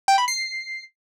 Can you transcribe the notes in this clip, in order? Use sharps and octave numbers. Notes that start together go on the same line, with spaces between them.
G5
B5
C7